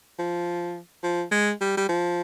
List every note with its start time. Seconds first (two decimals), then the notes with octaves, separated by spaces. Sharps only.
0.19 F3
1.03 F3
1.32 G#3
1.61 G3
1.77 G3
1.89 F3